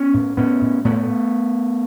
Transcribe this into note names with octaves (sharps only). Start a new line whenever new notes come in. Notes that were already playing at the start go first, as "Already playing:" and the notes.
Already playing: B3 C#4
A2
A2 B3 C#4
A2
A2 A3 B3